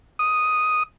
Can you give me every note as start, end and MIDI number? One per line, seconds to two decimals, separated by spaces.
0.19 0.83 87